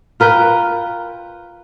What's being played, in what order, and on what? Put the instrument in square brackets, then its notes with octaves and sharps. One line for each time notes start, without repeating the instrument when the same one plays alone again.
[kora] F4 A#4 B4 G5